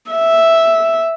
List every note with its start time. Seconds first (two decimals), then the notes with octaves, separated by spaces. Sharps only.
0.11 E5